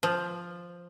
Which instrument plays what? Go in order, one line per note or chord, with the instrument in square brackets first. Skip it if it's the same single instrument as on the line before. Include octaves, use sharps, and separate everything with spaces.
[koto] F3